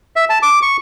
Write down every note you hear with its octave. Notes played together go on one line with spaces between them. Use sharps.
E5
A5
D6
C#6